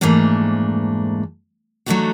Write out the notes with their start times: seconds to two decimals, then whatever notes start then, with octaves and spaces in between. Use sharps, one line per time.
0.01 F2 G#2 E3 A3 A#3 D4
1.86 F#3 A3 B3 D4 D#4 F#4